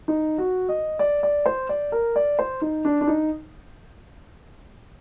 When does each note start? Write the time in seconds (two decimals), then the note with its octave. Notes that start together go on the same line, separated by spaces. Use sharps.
0.08 D#4
0.38 F#4
0.69 D#5
0.99 D5
1.23 D5
1.46 C5
1.69 D5
1.92 A#4
2.16 D5
2.39 C5
2.62 D#4
2.85 D4
3.01 D4
3.07 D#4